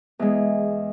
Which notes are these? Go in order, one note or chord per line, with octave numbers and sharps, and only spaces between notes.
E2 G#3